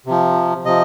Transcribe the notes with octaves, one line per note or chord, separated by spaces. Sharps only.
C3 F3
C3 F3 D#5